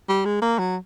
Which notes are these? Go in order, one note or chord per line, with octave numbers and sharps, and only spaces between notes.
G3
G#3
A#3
F#3